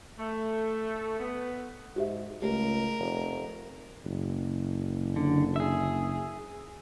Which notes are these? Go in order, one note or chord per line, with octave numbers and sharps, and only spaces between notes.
A3
B3
G#2 F#4 G4 E5
C#2 A3 G4 A#4
F1
F#1
D3
G#4 E5